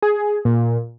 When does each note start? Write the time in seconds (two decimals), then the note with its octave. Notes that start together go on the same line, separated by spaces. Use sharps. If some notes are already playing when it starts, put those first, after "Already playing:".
0.02 G#4
0.45 A#2